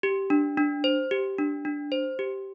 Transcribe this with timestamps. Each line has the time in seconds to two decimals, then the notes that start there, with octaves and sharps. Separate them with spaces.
0.03 G4
0.30 D4
0.58 D4
0.84 C5
1.11 G4
1.38 D4
1.65 D4
1.92 C5
2.19 G4